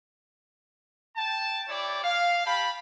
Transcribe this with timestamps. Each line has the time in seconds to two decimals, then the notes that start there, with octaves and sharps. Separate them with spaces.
1.16 G5 A5
1.68 E4 G4 C#5 D5
2.03 F5
2.45 G4 F5 G5 A5 B5